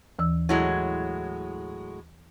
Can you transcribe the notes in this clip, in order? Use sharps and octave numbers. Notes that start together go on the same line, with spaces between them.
D#2 E3 E6
A2 F#3 G#3 E4